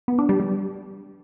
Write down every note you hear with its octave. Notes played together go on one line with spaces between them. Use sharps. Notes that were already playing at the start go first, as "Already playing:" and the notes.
B3
D4
G3
G3